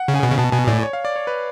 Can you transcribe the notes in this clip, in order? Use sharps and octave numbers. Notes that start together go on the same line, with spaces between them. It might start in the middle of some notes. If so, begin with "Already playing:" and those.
Already playing: F#5
C#3
G#5
B2
C#3
B2 A5
B2 G#5
A2 D5
C#5
F5
D5
C#5
B4